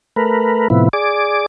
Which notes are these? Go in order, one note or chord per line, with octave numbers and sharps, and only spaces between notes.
A3 A#4 B4
A2 C3 F3 B3 E4
G#4 D5 D6